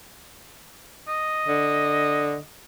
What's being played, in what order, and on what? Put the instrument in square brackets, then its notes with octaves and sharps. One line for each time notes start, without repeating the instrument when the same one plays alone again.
[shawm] D#5
[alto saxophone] D3